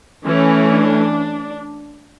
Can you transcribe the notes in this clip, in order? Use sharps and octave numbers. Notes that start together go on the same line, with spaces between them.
E3 A3 C#4
D4